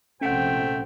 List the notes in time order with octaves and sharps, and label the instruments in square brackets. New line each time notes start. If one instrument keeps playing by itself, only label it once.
[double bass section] A#1 C3 C4 [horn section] A3 G5 [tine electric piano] C#4 F#5